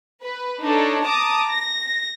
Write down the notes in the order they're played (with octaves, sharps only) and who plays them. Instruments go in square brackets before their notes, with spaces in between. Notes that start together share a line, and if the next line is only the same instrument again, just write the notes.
[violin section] B4
D4 D#4 A4 C#5
A5 A#5 D6 D#6
A#6